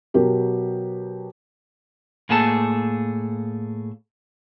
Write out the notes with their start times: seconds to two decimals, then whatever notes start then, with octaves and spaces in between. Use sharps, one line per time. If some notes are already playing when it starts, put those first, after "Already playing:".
0.14 B2 F#3 G4 A#4
2.29 A2 A#3 G#4 A4 A5